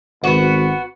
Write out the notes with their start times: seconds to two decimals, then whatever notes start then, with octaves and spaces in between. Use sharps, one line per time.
0.24 G#1 B3 F#4